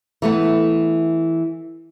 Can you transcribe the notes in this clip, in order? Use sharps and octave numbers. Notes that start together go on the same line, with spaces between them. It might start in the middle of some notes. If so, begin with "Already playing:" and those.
E3 A3 B3